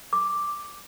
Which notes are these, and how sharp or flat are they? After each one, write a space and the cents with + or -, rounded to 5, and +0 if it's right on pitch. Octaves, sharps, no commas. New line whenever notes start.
D6 +0